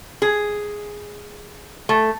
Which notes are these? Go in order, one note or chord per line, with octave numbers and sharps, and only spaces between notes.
G#4
A3